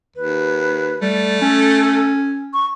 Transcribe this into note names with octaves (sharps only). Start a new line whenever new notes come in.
D#2 B4
G3 A3
C#4 A4
C#6